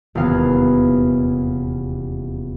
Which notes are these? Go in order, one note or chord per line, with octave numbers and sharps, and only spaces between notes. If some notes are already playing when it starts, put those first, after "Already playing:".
D#1 E2 C3 B3 F5 G#5